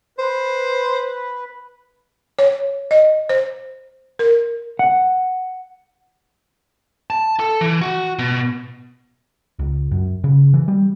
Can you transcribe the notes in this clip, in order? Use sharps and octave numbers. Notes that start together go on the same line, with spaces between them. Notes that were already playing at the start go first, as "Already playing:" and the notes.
B4 C5
C#5
D#5
C5
A#4
F#5
A5
A4
E3
F#4
B2
C#2
F#2
C#3
E3
G3